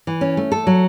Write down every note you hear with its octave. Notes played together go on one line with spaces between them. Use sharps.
E3
C#4
A3
A4
F#3